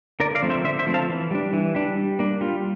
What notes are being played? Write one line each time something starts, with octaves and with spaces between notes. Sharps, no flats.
D3 A#4 D5
D5 F5
F3 A3 C4
C5 E5
D3 C5 E5
C5 E5
F3 A3 C4
F5 A5
E3
G3 D4
E3
G3 D4
G3
A#3 D4
G3 F4